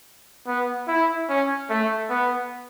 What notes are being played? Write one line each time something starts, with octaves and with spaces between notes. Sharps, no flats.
B3
E4
C#4
A3
B3